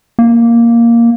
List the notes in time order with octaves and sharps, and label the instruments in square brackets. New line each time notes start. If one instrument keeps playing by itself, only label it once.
[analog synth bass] A#3